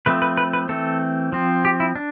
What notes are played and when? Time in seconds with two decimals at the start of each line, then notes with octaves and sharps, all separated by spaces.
0.06 F3 A3 C4 B4
0.22 B4
0.37 B4
0.53 B4
0.69 E3 A3 C4 A4
1.33 F3 C4
1.65 G4
1.80 E4
1.96 D4